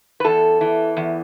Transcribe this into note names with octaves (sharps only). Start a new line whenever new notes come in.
B4
E2 A4
E3
E2